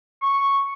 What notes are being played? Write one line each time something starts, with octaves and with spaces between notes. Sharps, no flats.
C#6